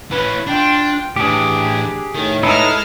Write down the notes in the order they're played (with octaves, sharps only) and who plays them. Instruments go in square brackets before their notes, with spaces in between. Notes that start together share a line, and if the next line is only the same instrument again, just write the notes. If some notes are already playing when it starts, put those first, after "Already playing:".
[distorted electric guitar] E3 C#4 [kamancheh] B4
[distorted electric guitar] D4 [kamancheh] F4 G5
[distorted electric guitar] A2 E3 [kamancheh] D4 [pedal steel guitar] G4 G#4
[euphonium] A2 [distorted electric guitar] D#3
[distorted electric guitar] G#3 G#4 [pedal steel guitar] D#4 E4 B4 [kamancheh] A5 F6